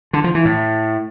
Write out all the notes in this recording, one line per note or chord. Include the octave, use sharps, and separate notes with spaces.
D3
F3
E3
A2